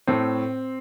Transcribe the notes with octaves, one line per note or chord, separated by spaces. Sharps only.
A2 A3 C4